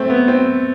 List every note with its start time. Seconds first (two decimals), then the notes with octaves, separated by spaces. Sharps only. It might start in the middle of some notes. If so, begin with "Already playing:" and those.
Already playing: A3 C4
0.10 B3
0.28 C4